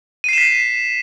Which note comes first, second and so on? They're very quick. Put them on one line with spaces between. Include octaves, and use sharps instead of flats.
D#7 C7 E7 B6